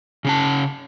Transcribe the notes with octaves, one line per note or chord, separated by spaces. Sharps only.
C#3 C#4 A5